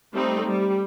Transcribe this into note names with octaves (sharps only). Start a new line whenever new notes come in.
G3 A3 C4 D#4
G3